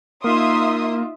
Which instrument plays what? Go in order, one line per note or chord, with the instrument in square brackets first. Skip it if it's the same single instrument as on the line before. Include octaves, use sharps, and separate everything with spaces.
[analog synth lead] A#3 [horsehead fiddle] D#4 F4 [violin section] E5 C6 D#6